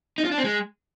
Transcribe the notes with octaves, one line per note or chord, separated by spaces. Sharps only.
D#4
F4
D4
C4
G#3